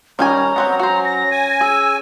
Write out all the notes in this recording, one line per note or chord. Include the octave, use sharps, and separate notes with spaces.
D#3 G3 C#4 G#5 A#5
F#3 B3 C4 F#5
F#4 C5 A#5
A#6
G#5
G#4 E6